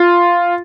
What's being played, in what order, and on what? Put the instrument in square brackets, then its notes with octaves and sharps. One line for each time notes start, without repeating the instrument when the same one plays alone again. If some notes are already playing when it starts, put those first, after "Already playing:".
Already playing: [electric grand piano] F4